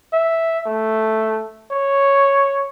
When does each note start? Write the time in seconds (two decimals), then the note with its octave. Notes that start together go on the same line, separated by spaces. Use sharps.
0.13 E5
0.67 A3
1.72 C#5